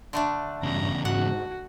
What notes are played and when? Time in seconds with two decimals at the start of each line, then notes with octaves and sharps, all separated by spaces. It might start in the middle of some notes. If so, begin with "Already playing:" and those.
0.13 D3 A3 D4
0.63 E2 G2 C#3 A#5
1.05 G#2 F#4 F#5